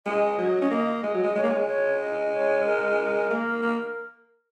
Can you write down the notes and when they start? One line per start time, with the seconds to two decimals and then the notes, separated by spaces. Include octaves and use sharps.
0.06 G#3 D#5
0.39 F#3
0.62 C#4
0.71 A#3
1.03 G#3
1.14 F#3
1.24 G#3
1.36 G#3 C#5
1.43 A#3
1.50 G#3
1.68 C#5
2.01 D#5
2.33 C#5
2.65 A#4
3.31 A#3
3.63 A#3